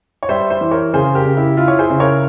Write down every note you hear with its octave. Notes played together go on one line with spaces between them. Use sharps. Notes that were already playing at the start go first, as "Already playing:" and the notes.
C#5
G3 C5 E5
C5 E5
E3
A#4 C#5
C#3 G#4 C5
G4 A#4
C#3
E4 G4
E4 F4
C#5
G#4 C5
C#3
A#4 C#5